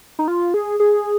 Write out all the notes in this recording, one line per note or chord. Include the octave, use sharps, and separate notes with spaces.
D#4
F4
G#4
G#4